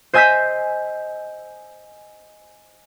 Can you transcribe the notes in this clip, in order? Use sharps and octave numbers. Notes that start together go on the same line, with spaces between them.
C5 D#5 G#5 E6 G6 B6